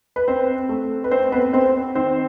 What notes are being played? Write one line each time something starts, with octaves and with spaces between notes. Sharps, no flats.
B4
C4 C5
A3
B4
C4 C5
B3 B4
C4 C5
D#3 C4 C5